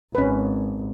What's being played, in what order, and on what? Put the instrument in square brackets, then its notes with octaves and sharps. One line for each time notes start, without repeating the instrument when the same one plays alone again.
[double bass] G#1 [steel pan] C#4 B4